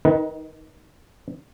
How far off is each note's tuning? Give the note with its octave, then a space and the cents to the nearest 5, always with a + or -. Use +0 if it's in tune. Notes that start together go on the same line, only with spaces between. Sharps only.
D#3 +0 D#4 +30 B4 -15